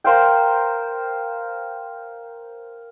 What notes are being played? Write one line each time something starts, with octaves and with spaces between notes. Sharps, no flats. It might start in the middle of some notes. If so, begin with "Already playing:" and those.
A#4 C5 F5 G5